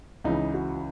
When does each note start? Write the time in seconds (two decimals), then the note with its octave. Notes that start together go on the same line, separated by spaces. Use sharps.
0.24 C#2 C#3 E3 D#4
0.54 F#4